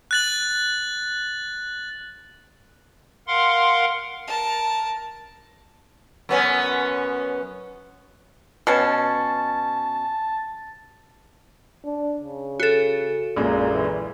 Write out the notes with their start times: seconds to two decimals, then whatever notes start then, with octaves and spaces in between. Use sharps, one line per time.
0.11 F#6 A6 F#7
3.27 A#4 F5 F#5 C6
4.27 A#4 A5
6.29 F#2 B3 C#4
8.67 B2 C#4 A5
11.85 D4
12.19 C#3
12.60 F#4 A4
13.36 A#1 F#2 A#2 G#3
13.72 E3